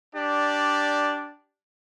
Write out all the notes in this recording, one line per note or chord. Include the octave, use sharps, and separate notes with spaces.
D4 G4 D5